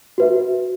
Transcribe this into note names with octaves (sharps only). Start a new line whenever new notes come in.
F#4 B4 E5